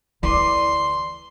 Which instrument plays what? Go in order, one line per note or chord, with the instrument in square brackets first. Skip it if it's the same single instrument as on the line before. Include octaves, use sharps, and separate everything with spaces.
[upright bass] D2 E3 [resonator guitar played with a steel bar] A4 B4 D5 [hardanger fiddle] C6